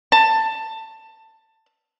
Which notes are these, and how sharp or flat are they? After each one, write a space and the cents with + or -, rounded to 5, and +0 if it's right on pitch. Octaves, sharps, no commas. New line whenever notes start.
A5 +15